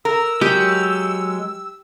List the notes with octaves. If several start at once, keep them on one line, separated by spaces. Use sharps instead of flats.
A#4 E6
F#3 G#3 G4